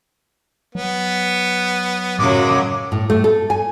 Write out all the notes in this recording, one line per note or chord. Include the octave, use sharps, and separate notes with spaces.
F#3 B3
F#2 A2 C#3 F#3 G#3 D6
A2
A3
A4
G#5